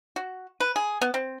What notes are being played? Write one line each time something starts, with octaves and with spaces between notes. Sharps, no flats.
F#4
B4
G#4
B3
C4